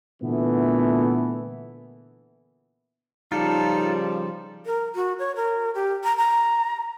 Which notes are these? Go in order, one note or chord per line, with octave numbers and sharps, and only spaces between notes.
A#2 D3 E3 A3 B3
C#3 F3 G3 D#4 F4 A4
A#4
F#4
C#5
A#4
G4
A#5
A#5